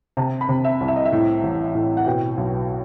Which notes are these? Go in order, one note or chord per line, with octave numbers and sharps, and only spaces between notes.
C3 A5
B5
C3
E5
C2
E5
D#5
E5
A2
A1
A2
F#5
B2 G5
B1